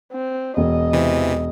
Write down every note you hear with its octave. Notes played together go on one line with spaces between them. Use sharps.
C4
E1 D#5
C3 E3